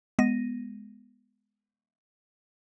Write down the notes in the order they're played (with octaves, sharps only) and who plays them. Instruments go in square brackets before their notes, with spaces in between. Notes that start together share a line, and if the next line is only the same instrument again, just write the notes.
[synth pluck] G#3 B3 A#6 D#7